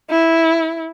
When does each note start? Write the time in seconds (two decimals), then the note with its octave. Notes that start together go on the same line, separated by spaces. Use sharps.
0.10 E4